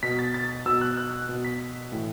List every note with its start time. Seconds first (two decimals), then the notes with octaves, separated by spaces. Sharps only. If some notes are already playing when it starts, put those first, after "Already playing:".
0.03 B2 B6
0.19 A6
0.34 A6
0.66 B2 E6
0.81 F#6
0.97 F#6
1.29 B2
1.45 B6
1.92 A2 E3